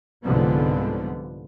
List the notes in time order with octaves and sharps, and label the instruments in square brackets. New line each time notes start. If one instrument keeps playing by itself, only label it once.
[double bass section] C2 G#2 D3 F3 G3 B3